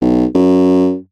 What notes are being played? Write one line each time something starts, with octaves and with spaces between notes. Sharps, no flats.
B1
F#2